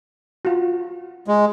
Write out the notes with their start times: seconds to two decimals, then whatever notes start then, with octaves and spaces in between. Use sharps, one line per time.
0.45 F4 F#4
1.28 G#3